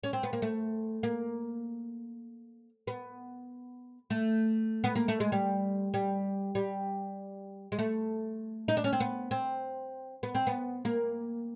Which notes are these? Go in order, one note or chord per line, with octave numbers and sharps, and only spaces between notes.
C#4
C4
B3
A#3
A3
A#3
B3
A3
B3
A#3
A3
G#3
G3
G3
G3
G#3
A3
D#4
D4
C#4
C4
B3
C4
B3
C4
B3
A#3